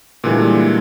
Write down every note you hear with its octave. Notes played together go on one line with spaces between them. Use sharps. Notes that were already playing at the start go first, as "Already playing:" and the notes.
A#2 D3 E3 G3 G#3